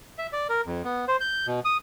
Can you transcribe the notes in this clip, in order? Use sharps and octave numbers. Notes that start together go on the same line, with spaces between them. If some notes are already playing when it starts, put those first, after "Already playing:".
E5
D5
A#4
F2
B3
C5
G6
B2
D#6